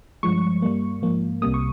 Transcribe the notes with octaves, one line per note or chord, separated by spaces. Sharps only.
G2 F3 G#3 C#6
G2 G3 A#3
G#2 F3 A#3
C2 C3 G3 A#3 D#6
C#6